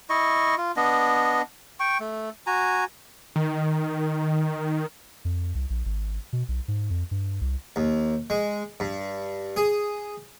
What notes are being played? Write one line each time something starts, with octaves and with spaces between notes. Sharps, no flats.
E4 D#5 C#6
F4
B3 D4 D#5
G5 C#6
A3
F#4 G#5 A#5
D#3
F2
C2
A#1
G#1
B2
B1
G#2
F2
G2
C2
D#2
G#3
G2
G#4